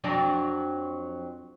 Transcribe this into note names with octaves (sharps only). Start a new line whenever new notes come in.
F2 F#3 D4